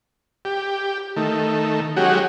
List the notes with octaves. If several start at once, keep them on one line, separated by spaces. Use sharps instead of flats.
G4
D#3 A3
F#3 G#3 C#4 F#4 G4